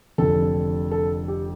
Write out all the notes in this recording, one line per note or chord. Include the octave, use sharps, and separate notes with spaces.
F1 F2 D3 F3 A4
A4
G4